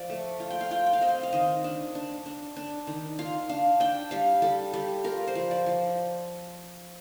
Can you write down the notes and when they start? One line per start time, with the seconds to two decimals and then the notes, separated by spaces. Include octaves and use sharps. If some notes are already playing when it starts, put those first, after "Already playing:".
Already playing: F3 D5
0.10 A3
0.40 F4
0.50 G5
0.61 F5
0.71 F4 G5
0.87 G5
0.93 F5
1.01 C4 D#5
1.08 F5
1.23 F5
1.33 D#3 D#5
1.64 D4
1.95 D4
2.26 D4
2.56 D4
2.87 D#3
3.19 F4 F5
3.49 D4 F5
3.80 D4 G5
4.11 G3 F5
4.42 G3 A4
4.73 G3 G4
5.04 F4 A#4
5.27 C5
5.35 F3
5.51 D5
5.66 F3